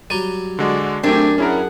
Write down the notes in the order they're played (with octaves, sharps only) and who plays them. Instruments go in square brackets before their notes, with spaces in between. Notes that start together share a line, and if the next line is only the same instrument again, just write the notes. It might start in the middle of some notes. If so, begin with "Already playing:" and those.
[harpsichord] F#3 G3 [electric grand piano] D#7
[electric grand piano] D3 G#3 [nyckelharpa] F#4 D5
[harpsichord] F#2 [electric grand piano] A3 C4 [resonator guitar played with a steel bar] D4 [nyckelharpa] G4 G#5
[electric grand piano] C#4 E4 A#4 [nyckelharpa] G#4 F#5